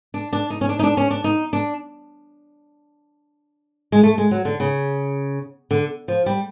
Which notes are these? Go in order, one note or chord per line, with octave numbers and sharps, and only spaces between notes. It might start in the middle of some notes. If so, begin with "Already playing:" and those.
D4
D4
D#4
C#4
D4
D#4
D4
C#4
D4
D#4
D4
G#3
A3
G#3
F#3
D3
C#3
D3
F3
G3